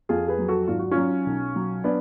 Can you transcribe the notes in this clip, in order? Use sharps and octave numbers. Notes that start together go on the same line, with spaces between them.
F2 F4 G#4
G#4 B4
F#3
F#4 A4
G#1 F4
F#4
C#4 F4
F#3
B1
F#3
B3 D4